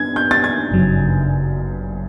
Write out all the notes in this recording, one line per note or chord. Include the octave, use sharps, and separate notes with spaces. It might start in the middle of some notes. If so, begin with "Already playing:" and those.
Already playing: B3 D4 G#6
G6
A6
G#6
G1 F#2 C#3 F#3